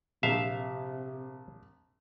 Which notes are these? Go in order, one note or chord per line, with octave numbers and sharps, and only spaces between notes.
A#1 C3 E5 F5